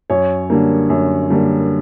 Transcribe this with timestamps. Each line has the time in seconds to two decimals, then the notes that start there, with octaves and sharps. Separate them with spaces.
0.10 F#2 C#5
0.50 D3 G3 A#3
0.90 F#2
1.30 D3 G3 A#3